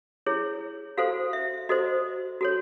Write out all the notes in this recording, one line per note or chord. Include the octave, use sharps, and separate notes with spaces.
E4 G#4 C#5
F#4 A4 C5 F5
E5
F#4 A4 C5 D#5
F#4 A4 C#5